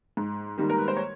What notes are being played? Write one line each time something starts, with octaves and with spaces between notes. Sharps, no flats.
G#2
D#3 G3 A#3
A#4
B4
C5
C#5